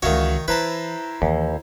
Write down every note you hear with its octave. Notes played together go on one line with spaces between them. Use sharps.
C#2 D#3 E3 F#4 C#5 E5 F5
E3 E4 B4 C5 A5 A#5
D#2 E3